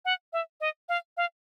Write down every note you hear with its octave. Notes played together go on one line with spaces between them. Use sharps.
F#5
E5
D#5
F5
F5